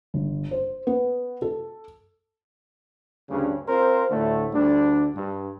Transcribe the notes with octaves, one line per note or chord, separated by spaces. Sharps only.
G1
C5
B3
A4
D2 G2 C#3 G3 C#4 D4
C4 F4 A#4 C5
D2 A2 D3 A3
D2 D3 G3 D4
G2